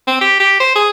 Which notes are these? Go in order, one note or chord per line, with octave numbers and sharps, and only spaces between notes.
C4
G4
G4
C5
G#4